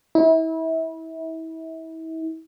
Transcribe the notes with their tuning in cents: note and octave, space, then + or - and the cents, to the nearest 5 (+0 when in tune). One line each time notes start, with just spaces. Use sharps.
E4 -35